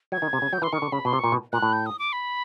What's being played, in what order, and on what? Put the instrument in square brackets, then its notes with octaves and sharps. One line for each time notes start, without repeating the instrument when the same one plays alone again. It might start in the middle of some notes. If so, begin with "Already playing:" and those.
[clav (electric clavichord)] F#3 [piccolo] G#6
[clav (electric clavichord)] D#3
C3
C#3
[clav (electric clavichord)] F#3 [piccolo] G6
[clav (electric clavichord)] E3 [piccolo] C6
[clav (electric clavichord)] D#3 [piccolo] C#6
[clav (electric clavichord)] D3
[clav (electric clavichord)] C#3 [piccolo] B5
[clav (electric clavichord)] B2 [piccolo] C6
[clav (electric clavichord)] C3
[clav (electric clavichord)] A#2 [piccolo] C#6
[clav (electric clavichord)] B2
[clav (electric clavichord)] A#2 [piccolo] F#6
[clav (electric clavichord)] A2
[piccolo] G6
D#6
D6
B5